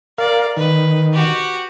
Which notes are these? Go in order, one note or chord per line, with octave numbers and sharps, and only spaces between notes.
A#4 D5 F5
D#3 B4
F#4 G4